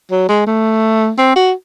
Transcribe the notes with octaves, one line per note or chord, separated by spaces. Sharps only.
F#3
G#3
A3
C4
F#4